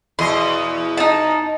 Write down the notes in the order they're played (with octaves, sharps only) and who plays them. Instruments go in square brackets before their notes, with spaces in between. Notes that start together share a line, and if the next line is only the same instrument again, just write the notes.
[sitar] E2 B2 D#5 [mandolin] C6
[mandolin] D#4 A5